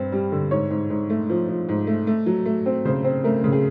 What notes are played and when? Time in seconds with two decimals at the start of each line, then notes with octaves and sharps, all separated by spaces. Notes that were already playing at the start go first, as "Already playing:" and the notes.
Already playing: G2 C4
0.12 G3
0.32 D3
0.51 G#2 C#5
0.70 G#2
0.90 G#2
1.10 A3
1.30 F3
1.49 F3
1.69 G#2
1.87 A3
2.07 A3
2.26 F#3
2.46 A3
2.66 C4
2.85 C#3 C5
3.04 C4
3.24 A3 A#4
3.44 C#3
3.52 G#4